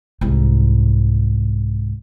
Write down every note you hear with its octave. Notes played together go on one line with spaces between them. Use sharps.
C2 G#2